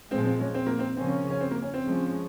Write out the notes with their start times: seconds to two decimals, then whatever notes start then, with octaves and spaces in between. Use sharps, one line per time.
0.11 A#2 F3 G#3 C4
0.25 C4
0.40 C#4
0.54 C4
0.66 A#3
0.79 C4
0.97 C#3 F3 A#3 C4 C#4
1.30 C#4
1.41 C4
1.51 A#3
1.62 C#4
1.74 C4
1.84 F3 G#3 C#4